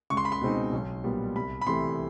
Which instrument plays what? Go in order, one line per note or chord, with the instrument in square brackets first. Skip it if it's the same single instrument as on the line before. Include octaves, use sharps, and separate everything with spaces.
[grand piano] C#2 C#6
C6
B5
C6
B2 G#3 C4 D#4
B1
A#2 G3 B3
C2 B5
B5
C3 E3 A3 C6